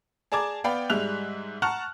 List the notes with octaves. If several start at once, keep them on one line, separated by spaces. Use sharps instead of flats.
G#4 D5 A5 A#5 D6 G#6
B3 D5 F5 G5 B5
G#2 G3 G#3 E5 F#6 F7
F#5 A5 A#5 C#6 F6 F#6